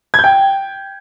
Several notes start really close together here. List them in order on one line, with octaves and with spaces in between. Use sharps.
G#6 G6 G5